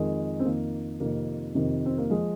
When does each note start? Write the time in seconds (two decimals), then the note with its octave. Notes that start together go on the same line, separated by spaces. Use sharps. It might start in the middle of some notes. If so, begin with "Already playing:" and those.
Already playing: F2 D#3 G#3
0.40 C4
0.45 F2 D#3 A#3
1.00 F2 C3 D#3 A#3
1.55 F2 C3 D#3
1.86 C4
1.98 A#3
2.10 F3 G#3